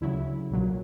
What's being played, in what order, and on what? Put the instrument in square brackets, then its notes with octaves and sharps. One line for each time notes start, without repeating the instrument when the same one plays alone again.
[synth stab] D2 C#3 F#3 E4
B1 A#2 F#3